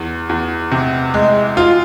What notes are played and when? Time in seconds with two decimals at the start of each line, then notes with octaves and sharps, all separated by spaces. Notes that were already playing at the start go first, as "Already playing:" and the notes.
Already playing: E2
0.29 E2
0.72 C3
1.14 G#3
1.57 F4